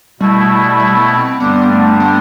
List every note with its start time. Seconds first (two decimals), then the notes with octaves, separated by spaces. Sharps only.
0.20 B2 G3 A3 E4
0.80 G3
0.95 B3
1.10 C4
1.39 G2 D3 G3 B3 D4
1.70 A3
2.00 B3